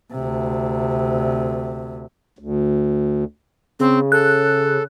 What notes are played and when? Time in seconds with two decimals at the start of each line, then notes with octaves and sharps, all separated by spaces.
0.13 D2 C3
2.39 D2
3.80 C#3 C4
4.12 A4 F#6